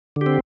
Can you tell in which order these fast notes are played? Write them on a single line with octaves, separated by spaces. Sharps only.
D3 G4 C4